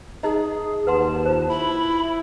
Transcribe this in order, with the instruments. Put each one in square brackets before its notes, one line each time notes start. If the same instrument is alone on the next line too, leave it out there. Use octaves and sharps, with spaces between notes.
[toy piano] D#4 D#5 A#5 [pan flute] G#4
[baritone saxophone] D#2 [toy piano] B4 F#5 C6 [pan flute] A5
[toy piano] F4 C5
[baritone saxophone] E4 [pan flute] B5